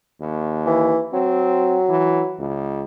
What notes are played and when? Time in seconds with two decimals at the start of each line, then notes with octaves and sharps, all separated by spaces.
0.21 D#2
0.66 E3
1.13 F#3 C4
1.89 E3
2.40 C#2